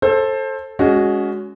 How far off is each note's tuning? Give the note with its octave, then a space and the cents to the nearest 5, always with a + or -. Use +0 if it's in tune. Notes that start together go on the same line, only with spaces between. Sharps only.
A4 +0 C5 +25
G#3 +0 C#4 +25 F#4 +0